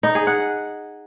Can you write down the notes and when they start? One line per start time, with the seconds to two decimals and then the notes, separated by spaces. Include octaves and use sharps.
0.03 D#4
0.15 G#4
0.27 F#5